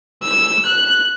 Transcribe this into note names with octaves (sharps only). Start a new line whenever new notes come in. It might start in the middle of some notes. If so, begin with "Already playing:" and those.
E6
F#6